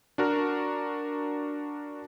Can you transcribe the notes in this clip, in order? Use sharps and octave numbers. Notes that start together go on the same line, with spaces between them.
D4 F#4 A#4